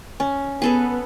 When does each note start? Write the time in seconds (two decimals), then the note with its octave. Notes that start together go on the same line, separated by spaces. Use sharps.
0.20 C#4
0.62 B3 G#4 A4 B4